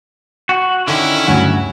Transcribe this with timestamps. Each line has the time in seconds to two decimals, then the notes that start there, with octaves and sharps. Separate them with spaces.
0.49 F#4
0.88 D3 D#3 C#4 E4
1.27 D2 G2 C#3 F#3 F#5